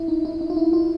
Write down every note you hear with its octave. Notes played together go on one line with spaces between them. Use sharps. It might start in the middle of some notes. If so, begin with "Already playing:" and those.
Already playing: E4
D#4
E4
D#4
F4
E4
F4